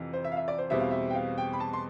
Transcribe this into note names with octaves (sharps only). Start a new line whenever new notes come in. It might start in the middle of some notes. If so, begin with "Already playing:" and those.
Already playing: F2 C3 E3
C5
E5
F5
E5
D5
C5
E2 B2 G3 C4 E5
F5
E5
G5
F5
G5
B5
A5
C6